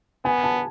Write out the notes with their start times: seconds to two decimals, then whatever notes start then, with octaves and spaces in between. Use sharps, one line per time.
0.25 B3 G#5
0.43 A5